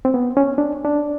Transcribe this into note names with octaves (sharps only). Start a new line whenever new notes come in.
C4
B3
C#4
D4
D4